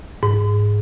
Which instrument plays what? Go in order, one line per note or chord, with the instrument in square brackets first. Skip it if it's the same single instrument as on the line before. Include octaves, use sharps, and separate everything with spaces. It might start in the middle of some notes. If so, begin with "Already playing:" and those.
[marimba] G#2